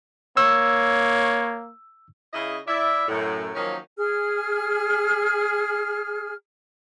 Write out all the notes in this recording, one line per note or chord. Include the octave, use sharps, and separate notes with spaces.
A#3 C#5 E6
C#3 E4 D#5
E4 D5 E5
F#2 A2
D#3 F3 F#3 A#3 C#4 D#4
G#4 F6